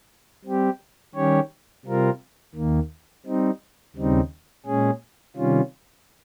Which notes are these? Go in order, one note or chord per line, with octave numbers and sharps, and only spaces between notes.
G3 C4 G4
D#3 G3 C#4 G4 C#5
C3 G3 C4 F4 A#4
D#2 D#3 A#3
G3 C4 D#4
D#2 C#3 G3 C4 D#4
A#2 G#3 C#4 G#4
C3 D#3 G3 C#4 F4